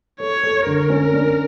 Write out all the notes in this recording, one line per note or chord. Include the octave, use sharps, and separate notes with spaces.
A4 C#5
A4
D3 A#4
C#4
D4